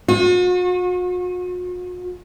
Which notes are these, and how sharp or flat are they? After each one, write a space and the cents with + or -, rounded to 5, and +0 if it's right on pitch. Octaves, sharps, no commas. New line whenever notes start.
F#4 -45